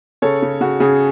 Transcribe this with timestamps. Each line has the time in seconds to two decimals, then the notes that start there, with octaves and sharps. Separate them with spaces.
0.22 C#3 A4 C#5
0.42 C#3
0.61 C#3 F#4
0.80 C#3 G#4